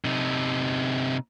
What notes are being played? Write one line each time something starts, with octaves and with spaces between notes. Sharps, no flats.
C3 D#4